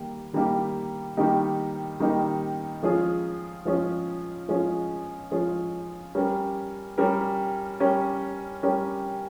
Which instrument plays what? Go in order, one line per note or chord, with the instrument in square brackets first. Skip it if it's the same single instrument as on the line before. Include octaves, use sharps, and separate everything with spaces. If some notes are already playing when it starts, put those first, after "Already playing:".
Already playing: [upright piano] D#3 G3 A#3 G4
D#3 G3 A#3 D#4 G4
D#3 G3 A#3 D#4 G4
D#3 G3 A#3 D#4 G4
F3 G#3 C#4 F4 G#4
F3 G#3 C#4 F4 G#4
F3 G#3 C#4 F4 G#4
F3 G#3 C#4 F4 G#4
G3 C#4 G4 A#4
G3 C#4 G4 A#4
G3 C#4 G4 A#4
G3 C#4 G4 A#4